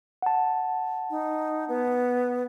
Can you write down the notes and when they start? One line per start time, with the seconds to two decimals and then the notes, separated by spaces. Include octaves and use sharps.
0.22 F#5 A5
1.10 D#4
1.68 B3